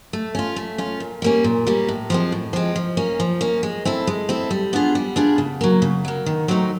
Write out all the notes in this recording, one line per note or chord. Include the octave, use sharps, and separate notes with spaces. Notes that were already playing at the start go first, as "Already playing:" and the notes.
A3
C#4 F4
A3
C#4 F4
A#2
G3 A#3 C#4
A#2
G3 A#3 C#4
A2
F3 G#3 C4
A2
F3 G#3 C4
F3
A#3 C#4
F3
A#3 C#4
G#3
C4 E4 A4
G#3
C4 E4 A4
G3
B3 D4 F4 G#4
G3
B3 D4 F4 G#4
C#3
F#3 A#3
C#3
F#3 A#3
D#3
F#3 A3 C4 D#4